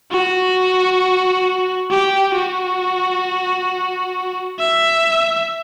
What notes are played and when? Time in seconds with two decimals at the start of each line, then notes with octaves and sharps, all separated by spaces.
0.12 F#4
1.91 G4
2.35 F#4
4.59 E5